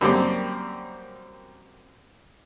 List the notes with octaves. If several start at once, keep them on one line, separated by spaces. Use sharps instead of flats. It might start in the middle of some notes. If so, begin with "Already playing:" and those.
F#2 G3 A#3 C4 D5 D6